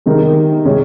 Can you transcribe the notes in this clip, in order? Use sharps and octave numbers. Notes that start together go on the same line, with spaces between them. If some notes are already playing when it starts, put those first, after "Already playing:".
C3 D#3 G#3 D#4 A#4
C3 D#3 G#3 C#4